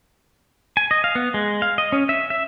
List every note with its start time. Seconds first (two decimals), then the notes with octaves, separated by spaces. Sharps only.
0.77 G#5
0.91 D#5
1.04 F5
1.15 B3
1.34 G#3
1.62 F5
1.78 D#5
1.92 C#4
2.09 E5
2.30 E5